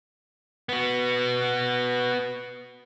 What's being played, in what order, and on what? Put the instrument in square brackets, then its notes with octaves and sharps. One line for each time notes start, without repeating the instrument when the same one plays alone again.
[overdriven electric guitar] B3 F#4